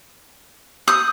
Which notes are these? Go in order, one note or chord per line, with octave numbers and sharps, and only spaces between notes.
D#6 E6 G6